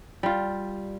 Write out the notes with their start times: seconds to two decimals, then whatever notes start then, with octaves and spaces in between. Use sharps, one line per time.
0.23 G3 F4